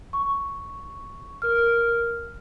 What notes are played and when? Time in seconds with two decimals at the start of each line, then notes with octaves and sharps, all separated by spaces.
0.13 C#6
1.42 A#4 F6